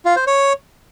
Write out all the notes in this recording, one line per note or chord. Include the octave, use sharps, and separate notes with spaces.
F4
C5
C#5